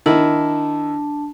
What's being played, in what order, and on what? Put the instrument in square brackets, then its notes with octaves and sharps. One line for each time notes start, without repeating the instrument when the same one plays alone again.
[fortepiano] D#3 E4 [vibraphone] D4 A5